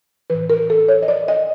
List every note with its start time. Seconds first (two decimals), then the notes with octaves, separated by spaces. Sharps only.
0.30 A2 E3 B4
0.50 A#4
0.70 A4
0.89 C#5
1.03 D#5
1.08 D5
1.28 D#5